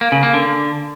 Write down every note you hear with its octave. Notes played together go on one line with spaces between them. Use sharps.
A#3
C#3
A#3
D3